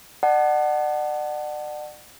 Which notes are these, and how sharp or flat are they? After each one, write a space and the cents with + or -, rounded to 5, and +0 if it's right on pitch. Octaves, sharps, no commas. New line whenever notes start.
D5 +40 F#5 +15 A5 +0